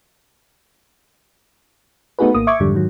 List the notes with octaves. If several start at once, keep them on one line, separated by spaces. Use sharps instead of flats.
A3 B3 D#4 F#4 G#4 B4
G#1 A#3 D#6
E5 C#6 D6 G#6
F2 G#2 D3 G3
G#2 D#3 F#3